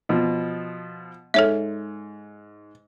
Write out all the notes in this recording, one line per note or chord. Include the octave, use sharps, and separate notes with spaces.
B2 F3
G#2 A4 C#5 E5